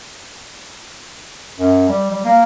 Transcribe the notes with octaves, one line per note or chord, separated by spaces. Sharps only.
F#2
G3
G3
A#3